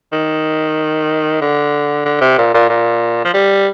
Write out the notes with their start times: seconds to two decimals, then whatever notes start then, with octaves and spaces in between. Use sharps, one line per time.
0.13 D#3
1.41 D3
2.05 D3
2.21 C3
2.38 A#2
2.54 A#2
2.70 A#2
3.25 F3
3.34 G3